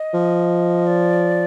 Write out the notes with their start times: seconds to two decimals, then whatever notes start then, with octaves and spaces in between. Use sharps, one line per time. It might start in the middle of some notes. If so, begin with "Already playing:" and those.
Already playing: D#5
0.14 F3
0.87 D5